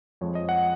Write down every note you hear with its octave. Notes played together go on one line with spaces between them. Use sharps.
F2 F3 G#3 C#5
D#5
F#5